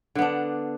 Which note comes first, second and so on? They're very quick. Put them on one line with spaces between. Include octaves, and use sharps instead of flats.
D3 B3 D4